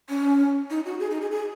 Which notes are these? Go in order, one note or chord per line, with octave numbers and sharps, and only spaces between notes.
C#4
D#4
F#4
G#4
D#4
G#4
G#4